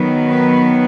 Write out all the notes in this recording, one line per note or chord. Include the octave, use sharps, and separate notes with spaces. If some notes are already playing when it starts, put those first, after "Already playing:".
Already playing: D#3 F#3 B3
B4